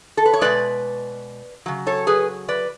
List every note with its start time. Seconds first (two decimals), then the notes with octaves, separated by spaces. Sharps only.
0.17 A4
0.26 B4
0.33 C#5
0.41 B2 G#3 B4 D5
1.66 C#3 F#3
1.86 A4 C#5
2.07 G#4 B4
2.48 B4 D5